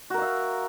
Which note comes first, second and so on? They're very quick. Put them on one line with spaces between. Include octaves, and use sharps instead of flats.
F#4 A#4 F5 E5